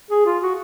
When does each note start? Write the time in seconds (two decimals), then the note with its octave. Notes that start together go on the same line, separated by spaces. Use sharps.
0.11 G#4
0.26 F4
0.42 F#4